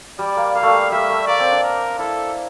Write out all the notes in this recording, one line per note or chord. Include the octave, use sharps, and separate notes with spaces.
G3 D5
A#3
A#3 F5
G3 A3
G3 E5
A3
A#3 D5
C4
D4
A#4
E4 A4